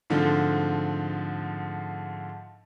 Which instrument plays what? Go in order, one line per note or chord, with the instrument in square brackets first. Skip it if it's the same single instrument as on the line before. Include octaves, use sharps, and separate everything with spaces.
[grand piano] G#2 D3 F3 A3 C4